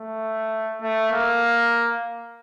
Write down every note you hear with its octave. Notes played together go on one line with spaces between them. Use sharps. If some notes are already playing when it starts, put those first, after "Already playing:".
Already playing: A3
A3
A#3